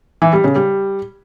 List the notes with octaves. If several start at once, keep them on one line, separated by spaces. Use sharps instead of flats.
E3
G3
C#3
G3